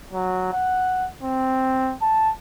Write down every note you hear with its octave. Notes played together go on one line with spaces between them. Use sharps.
F#3
F#5
C4
A5